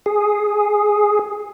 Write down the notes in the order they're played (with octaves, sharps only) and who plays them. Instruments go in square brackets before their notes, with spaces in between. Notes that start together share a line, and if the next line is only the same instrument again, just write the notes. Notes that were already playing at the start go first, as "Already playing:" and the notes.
[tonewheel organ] G#4